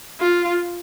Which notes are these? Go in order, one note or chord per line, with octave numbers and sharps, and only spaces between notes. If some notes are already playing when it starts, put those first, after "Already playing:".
F4